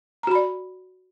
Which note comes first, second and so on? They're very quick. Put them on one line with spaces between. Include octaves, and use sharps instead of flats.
A#5 F#4 B5 D5